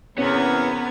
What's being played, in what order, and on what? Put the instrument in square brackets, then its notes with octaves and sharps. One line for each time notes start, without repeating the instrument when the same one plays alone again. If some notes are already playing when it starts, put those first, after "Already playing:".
[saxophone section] E2 [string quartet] C3 A#4 G#6 [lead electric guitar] B3 [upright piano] C#4